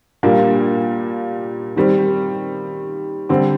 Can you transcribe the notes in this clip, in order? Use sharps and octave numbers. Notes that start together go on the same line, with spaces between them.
A#2 G3 A#3 D4
D#3 G3 C4
D3 G3 C4